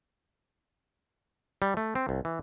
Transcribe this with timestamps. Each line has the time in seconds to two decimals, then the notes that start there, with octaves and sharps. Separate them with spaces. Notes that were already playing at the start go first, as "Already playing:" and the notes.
1.62 G3
1.77 A3
1.95 C4
2.09 C2
2.25 E3